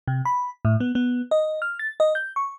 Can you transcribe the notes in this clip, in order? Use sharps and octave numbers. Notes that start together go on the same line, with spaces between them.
C3
B5
A2
B3
B3
D#5
F6
A6
D#5
G6
C#6